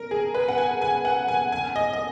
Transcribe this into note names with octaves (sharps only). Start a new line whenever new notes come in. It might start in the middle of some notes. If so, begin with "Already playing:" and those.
Already playing: A#4
G#4
B4
F#5
G#5
G#5
F#5
G#5
G#5
D#5
D#5